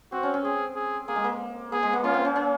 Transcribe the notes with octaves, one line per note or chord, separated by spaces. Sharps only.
C4 F#4
C#4
C#4
C4 G#4
G#4
A#3 G#4
G#3
A#3
A#3 G#4
G#3
A#3
C#4 F4
C4
C#4
C#4